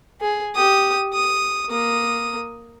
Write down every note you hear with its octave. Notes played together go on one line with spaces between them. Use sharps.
G#4
G4 D#6
D#6
A#3 D#6